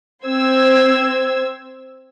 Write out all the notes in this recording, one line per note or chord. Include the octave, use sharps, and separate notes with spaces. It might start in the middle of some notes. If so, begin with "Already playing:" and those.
C4 C5 E6 G#6